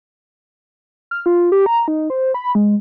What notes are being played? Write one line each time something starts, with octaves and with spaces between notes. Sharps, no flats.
F6
F4
G4
A#5
D#4
C5
B5
G#3